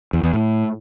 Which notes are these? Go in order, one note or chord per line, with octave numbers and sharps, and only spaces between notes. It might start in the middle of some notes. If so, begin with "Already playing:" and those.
E2
E2
A2